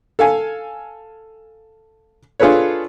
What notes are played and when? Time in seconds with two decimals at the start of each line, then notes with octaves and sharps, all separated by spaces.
0.19 A4 F5 G#5
2.40 D4 F4 G#4 A4 B4 C#5